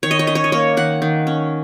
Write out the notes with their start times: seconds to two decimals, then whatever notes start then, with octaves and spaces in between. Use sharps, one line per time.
0.03 D#3 C#5
0.11 D#5
0.19 C#5
0.27 C#4 D#5
0.35 C#5
0.44 D#5
0.52 A#3 C#5
0.77 D#3 F#5
1.02 D#3
1.27 C#4